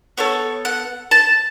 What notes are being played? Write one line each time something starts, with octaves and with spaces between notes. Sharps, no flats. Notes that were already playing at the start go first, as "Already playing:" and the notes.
B3 A4 C#5
F#5
A5